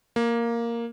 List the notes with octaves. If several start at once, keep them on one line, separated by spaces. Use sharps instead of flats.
A#3